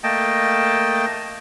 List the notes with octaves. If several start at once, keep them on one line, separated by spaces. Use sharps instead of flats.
A3 A#3 D#5 G5 A5